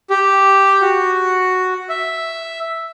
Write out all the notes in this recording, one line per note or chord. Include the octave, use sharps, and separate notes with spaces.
G4
F#4
E5